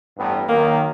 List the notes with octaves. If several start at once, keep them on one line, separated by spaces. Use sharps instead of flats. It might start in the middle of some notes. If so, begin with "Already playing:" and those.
A1 G2 B3
F#2 D#3 A#3